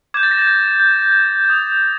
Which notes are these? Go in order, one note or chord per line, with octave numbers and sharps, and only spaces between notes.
D6 G6 G#6
A6
A#6
A6
G#6
G6
G#6
D#6 G6